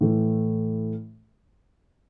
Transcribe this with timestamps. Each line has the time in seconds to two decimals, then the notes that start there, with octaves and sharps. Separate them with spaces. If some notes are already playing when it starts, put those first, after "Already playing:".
0.01 A2 E3 A3